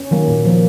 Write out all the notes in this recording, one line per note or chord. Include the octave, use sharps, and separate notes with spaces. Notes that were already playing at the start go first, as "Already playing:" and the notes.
Already playing: C#4
D#3 F#3 A#3
A#2
F3 A#3